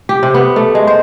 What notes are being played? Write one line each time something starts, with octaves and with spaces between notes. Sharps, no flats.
G4
C3
B3
A3
G#3
C5